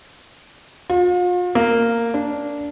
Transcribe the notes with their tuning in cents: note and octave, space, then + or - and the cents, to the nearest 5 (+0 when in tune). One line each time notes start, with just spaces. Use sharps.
F4 +40
A#3 -10
D4 -15